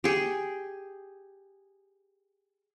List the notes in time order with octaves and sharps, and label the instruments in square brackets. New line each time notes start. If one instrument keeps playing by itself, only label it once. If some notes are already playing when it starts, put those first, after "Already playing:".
[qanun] G4 G#4